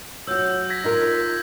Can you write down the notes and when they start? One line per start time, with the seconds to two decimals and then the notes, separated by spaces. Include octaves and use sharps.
0.27 F#3 F#4 E6 G6
0.70 G#6 A#6 B6
0.84 D#4 F4 A#4